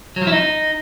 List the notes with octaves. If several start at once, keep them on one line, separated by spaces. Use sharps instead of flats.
F#3
F3
E4
D#4